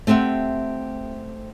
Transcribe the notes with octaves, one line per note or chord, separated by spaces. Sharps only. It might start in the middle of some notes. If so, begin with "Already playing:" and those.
A3 C4 G4 E5 F#5